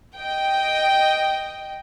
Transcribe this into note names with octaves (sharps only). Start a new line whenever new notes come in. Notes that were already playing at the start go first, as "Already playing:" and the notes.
D#5 G5